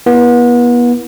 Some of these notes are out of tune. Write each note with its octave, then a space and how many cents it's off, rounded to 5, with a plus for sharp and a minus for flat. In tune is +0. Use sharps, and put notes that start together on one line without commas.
B3 -35 E4 +0